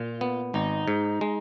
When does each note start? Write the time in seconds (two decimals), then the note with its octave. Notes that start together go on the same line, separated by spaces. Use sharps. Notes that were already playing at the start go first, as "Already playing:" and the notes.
Already playing: A#2 F4
0.21 B3
0.54 G#1 D#4
0.88 G#2
1.21 G#3